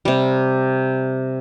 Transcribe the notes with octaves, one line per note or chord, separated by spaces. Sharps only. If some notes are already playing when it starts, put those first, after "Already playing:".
C3 G3